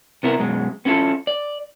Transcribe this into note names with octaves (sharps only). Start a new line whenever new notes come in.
C3 B3 E4 A#4
F#2 B2 G#3
B3 C#4 E4 F4 A4
D5